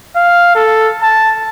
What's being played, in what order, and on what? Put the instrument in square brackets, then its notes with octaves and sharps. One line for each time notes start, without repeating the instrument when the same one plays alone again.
[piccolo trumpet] F5
A4
A5